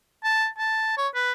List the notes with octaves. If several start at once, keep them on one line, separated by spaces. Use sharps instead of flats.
A5
A5
C#5
B4